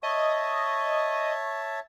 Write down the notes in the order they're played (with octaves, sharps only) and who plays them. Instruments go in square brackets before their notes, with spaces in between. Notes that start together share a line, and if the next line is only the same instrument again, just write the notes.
[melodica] C#5 E5 A5 [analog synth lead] D#5 [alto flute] C#6